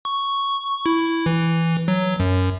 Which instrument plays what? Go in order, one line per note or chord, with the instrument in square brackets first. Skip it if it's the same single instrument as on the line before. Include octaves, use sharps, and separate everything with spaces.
[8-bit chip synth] C#6
E4
E3
F#3
F#2